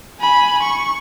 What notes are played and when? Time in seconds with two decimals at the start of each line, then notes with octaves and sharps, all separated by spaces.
0.21 G#5 B5
0.63 C#6